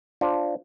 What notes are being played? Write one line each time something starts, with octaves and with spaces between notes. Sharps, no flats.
D4 F4 C5